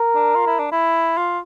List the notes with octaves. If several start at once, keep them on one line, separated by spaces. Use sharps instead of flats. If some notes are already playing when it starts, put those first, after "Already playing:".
Already playing: A#4
D4
F4
E4
D4
E4
F4